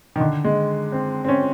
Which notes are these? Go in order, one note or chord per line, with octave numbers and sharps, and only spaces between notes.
D#3
D3
G#3
C4
C4
C#4